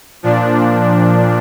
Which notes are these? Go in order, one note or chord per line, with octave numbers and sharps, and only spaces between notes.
A#2 F3 D4